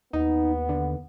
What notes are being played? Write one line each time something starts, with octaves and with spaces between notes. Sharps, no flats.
D#2 B3 D#4
D3